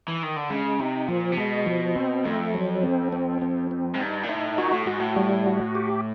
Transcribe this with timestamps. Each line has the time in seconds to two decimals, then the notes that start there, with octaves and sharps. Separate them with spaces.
0.08 E3
0.23 D#3
0.36 D3
0.50 C#3 G#3
0.80 C3 D#4
1.08 A#2 F3
1.32 C3
1.38 B2 G#3
1.66 F3
1.95 C4
2.25 F2 A3
2.54 F#3
2.83 C4
3.12 C4
3.42 C4
3.71 C4
3.94 G#2
4.00 G2 D#4
4.23 A#2
4.29 A2 D#4
4.58 A#2 F#4
4.71 A2
4.86 G#2 F#4
5.00 A2
5.16 G3
5.46 F#4
5.75 G4